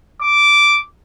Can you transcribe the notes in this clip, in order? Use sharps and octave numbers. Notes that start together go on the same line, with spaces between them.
D6